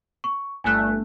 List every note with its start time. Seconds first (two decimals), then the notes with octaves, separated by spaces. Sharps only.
0.24 C#6
0.64 G1 A3 G#5 F#6